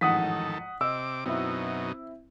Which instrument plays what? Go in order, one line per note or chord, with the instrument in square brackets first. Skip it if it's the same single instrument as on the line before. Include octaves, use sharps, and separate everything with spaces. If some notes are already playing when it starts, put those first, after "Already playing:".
[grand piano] A1 F2 G#2 [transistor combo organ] D#3 A4 [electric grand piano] F#5 D#6 B6
[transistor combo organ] C3 D6 [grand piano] D#5 [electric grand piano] E6
[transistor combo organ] F#2 B2 D#4 [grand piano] C4 E4